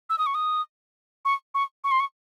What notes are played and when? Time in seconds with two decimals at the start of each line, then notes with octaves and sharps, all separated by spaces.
0.10 E6
0.18 D#6
0.26 C#6
0.35 D#6
1.25 C#6
1.55 C#6
1.84 C#6
1.91 C6
2.00 C#6